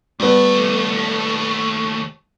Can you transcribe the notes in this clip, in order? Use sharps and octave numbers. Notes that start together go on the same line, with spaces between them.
D#2 G3 A3 B3